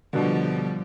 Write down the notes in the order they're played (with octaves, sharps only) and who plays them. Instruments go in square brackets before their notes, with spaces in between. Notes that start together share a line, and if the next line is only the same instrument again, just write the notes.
[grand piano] B2 D3 [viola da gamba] F3 G3